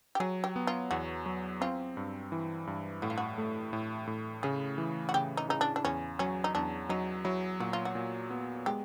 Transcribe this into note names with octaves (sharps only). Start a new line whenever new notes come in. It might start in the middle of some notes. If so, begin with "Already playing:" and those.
G4
F#3 G#4
G4
B3
F4
E2 F#4
F#3
C4 F4
G2
E3
G2
A2 F#4
F4
F#4
A3
A2
A2
C#3 G#4
E3
F#4
C#3 G4
D#4
C#3 D#4
D4
D4
E2 C#4
F#3 C#4
D#4
E2 D4
F#3 D#4
F#3 E4
A#2 F#4
F4
F#4
A#2
B3
G#3 G4